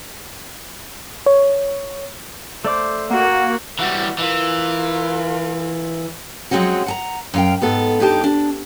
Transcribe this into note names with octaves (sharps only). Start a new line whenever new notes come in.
C#5
A3 C5 D5 D6
A#3 F#4 F#5
E3 G3 E4 F#4
E3 F4 A#4
F3 F#3 G#3 C4 C#4 F#4
F#5 A5 A#5
F#2 F5 G5
G#2 B3 A4
G2 D#4 G4 A5
D4